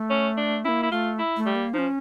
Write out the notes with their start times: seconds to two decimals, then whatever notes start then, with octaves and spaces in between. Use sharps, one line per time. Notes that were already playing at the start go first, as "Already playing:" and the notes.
Already playing: A3
0.10 C#4
0.37 D4
0.65 A#3 C#4 E4
0.83 E4
0.91 A3 F4
1.19 E4
1.37 A3
1.46 G3
1.55 A#3
1.74 F3 C#4 D#4